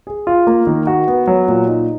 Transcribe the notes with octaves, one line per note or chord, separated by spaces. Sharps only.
G#4
F4
A#3
D#3
F#4
B3
F#3
A#2
D#4